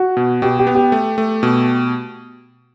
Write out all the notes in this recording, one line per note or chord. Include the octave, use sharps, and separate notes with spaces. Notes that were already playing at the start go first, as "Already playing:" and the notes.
Already playing: F#4
B2
B2 G4
G4
B3
G4
A3
A3
B2